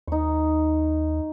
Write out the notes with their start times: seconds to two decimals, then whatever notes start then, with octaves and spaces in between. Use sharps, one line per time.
0.07 D#2 D#4 C#6